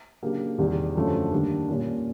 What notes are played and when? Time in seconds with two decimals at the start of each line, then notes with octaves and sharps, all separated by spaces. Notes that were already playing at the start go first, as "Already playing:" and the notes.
0.22 C#3 F#3 A#3 D4 G4
0.58 E2 C3 D#3 G3
0.96 F#2 D3 F3 A3 C#4
1.32 D#3 G3 A#3 D4
1.68 A#2 G3 A#3 C#4